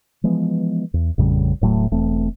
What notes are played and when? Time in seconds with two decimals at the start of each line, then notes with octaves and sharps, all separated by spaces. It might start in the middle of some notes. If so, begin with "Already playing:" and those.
0.24 E3 F3 G#3 B3
0.94 E2
1.18 A1 F2 C#3 G3
1.61 D#1 A2 F#3 A3
1.91 E1 E2 A3 C4